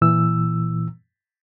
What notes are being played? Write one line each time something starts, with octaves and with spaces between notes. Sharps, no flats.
A#2 E3 E6